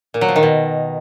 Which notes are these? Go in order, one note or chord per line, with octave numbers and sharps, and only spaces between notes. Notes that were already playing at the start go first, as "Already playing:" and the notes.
A#2
F#3
F3
D#3
B2